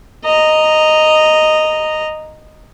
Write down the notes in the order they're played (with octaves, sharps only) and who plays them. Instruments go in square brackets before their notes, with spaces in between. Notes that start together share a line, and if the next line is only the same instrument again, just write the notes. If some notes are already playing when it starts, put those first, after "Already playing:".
[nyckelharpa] D#5 A#5